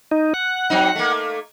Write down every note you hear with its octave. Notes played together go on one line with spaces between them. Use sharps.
D#4
F#5
F#3 C4 D#4
A3 A#3